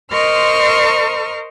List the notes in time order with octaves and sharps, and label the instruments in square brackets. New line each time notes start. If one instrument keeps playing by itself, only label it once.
[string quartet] A#4 C5 D#5 C6 C#6 F6